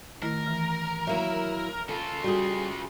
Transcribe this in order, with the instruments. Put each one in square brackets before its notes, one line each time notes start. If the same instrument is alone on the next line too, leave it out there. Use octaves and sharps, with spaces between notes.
[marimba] D#3 A3 E4 [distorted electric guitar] A#4
[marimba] E3 F6
[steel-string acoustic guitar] F#3 A#3 E4 [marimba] E5
[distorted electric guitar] C#3 F4 [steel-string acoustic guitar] A4
[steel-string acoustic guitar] G3 G#4 [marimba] F#4